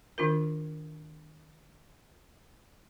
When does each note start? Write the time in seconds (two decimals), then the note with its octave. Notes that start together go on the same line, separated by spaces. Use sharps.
0.18 D#3 D4 F4 A#4